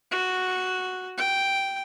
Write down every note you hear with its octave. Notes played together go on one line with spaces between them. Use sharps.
F#4
G5